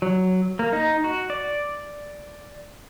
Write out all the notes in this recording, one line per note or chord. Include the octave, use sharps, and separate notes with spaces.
F#3
A#3
D#4
F#4
D5